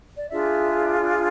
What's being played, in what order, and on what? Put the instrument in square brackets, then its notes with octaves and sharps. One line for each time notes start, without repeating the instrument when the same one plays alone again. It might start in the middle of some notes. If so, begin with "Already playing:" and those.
[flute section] D5
D4 F4 G#4 E5